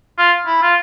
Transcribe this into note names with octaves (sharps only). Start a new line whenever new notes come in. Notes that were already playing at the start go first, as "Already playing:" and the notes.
F4
E4
F4